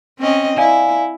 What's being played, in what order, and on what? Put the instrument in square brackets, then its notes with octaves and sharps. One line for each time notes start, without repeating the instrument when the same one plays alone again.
[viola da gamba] C4 C#4 D#5
[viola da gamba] E4 [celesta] D5 F5 G#5